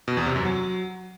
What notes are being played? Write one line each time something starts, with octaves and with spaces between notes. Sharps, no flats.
B2
E2
C3
F#2
F#3